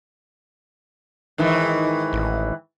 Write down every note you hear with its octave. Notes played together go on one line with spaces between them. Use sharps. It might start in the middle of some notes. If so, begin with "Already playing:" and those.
G#2 D#3 E3
A1